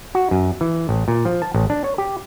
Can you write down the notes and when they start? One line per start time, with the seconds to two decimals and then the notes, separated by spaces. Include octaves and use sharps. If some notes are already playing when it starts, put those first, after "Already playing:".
0.15 F#4
0.31 F#2
0.61 E3
0.89 A1
1.08 A#2
1.25 F3
1.42 A5
1.54 A1
1.70 D4
1.84 C#5
1.98 G4